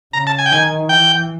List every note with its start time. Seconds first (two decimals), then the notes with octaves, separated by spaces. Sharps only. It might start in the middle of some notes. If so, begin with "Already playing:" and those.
0.13 C#3 A#5
0.27 A5
0.38 G#5
0.46 G5
0.52 D#3 G#5
0.89 E3 G5